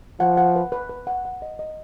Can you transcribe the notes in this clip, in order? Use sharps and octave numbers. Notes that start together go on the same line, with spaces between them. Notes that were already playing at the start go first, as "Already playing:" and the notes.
F3 F#5
F#5
B4
B4
B4
F#5
F#5
D#5
D#5